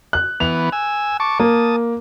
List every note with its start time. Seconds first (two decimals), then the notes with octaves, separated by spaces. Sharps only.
0.13 F#6
0.40 E3 B3 F7
0.72 G#5 E6
1.20 A5 C#6 D6
1.40 A#3 A5 D#6